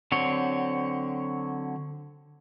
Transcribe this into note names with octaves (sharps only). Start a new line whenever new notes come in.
D3 F#3 C4 C#5